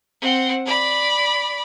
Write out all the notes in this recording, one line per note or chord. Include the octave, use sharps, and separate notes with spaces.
C4 F#5
D5 B5